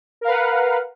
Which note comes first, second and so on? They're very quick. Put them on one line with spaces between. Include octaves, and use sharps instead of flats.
A#4 F5 B4 F#5